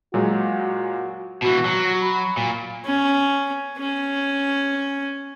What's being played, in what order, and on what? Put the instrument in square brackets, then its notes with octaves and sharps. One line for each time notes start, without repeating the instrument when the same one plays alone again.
[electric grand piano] A#2 F#3 G#3 [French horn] F#4
[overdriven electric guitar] B2 E3 [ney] F#4
[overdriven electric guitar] F#3
[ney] B5
[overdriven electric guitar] A#2
[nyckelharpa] C#4
C#4